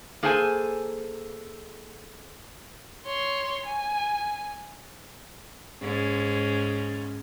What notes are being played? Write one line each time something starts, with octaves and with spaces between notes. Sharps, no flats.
A#3 G#4 A4 C5 G5 G#5
C#5 C6
G#5
G#2 C#4